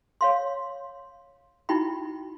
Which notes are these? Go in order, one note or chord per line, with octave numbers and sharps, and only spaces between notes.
C#5 F5 C6
D#4 E4 F#4 G5 B5